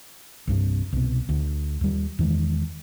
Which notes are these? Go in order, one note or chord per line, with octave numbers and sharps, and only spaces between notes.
C2 G2 C3
C2 B2
D2
D#2 G3
E2 D#3 F#3 G#3